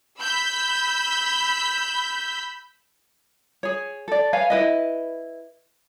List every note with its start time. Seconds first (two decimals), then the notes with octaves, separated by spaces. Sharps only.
0.19 B5 E6 G6 B6
3.63 G#4 C#5
4.08 A4 D5
4.33 B4 C#5 F5 G#5
4.50 E4 B4 D#5